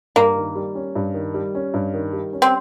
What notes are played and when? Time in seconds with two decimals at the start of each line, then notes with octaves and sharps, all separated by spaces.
0.16 G2 A#3
0.36 D#3
0.55 G3
0.75 C#4
0.95 G2
1.14 D#3
1.34 G3
1.55 C#4
1.74 G2
1.94 D#3
2.13 G3
2.33 C#4
2.42 C4